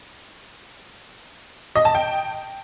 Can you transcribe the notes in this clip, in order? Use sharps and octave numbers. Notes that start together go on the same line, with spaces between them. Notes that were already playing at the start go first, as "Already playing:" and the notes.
D#5
A5
G5